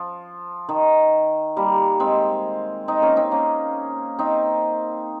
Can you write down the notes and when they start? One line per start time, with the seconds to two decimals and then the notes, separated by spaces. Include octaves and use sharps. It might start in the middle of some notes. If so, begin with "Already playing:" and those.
Already playing: F3
0.69 D#3
1.57 G3 A#3
2.00 G#3 C4
2.88 C4 D#4
3.02 A#3 C#4
3.17 C4 D#4
3.31 A#3 C#4
4.19 C4 D#4